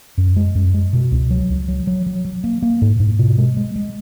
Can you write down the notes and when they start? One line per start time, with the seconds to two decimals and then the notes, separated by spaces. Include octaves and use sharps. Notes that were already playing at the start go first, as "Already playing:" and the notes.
0.18 F#2
0.36 G#3
0.55 F#2
0.74 G#3
0.93 B2
1.12 C#2
1.31 F#3
1.50 C#2
1.68 F#3
1.87 F#3
2.06 F#3
2.25 F#3
2.44 A#3
2.62 A#3
2.82 G#2
3.00 G#2
3.19 B2
3.38 G#3
3.57 G#3
3.76 G#3